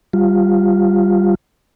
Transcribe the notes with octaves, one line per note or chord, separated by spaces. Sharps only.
G3 F4